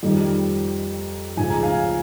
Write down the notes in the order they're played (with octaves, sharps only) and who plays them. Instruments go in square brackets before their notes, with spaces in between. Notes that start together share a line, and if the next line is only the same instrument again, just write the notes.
[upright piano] F2 D#3 G3
C#2 C#3 F3 G#5
A#5
F5 G#5